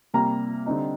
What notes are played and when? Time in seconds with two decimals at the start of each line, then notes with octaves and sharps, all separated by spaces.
0.14 C3 G3 A#3 A#5
0.66 D3 G3 C4 D#4